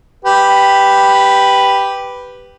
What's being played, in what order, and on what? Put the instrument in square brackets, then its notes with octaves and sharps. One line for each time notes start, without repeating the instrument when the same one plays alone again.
[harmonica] G4 B4